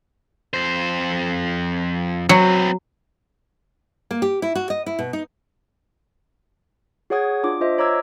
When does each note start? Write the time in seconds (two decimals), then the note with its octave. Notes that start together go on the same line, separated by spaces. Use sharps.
0.54 F2 C5
2.29 F#3 C4 B4
4.11 A#3
4.22 G4
4.42 E4
4.55 F#4
4.70 D#5
4.86 E4
4.99 B2
5.13 D#4
7.10 F#4 G#4 C#5 F#5 D#6 G#6
7.43 D4 F4 D6
7.61 F4 C5 D#5 E5
7.78 C#5 A#5 D6 E6 G#6